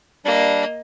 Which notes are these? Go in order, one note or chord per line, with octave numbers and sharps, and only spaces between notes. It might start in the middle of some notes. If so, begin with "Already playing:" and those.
G3 A#3 D4 D#5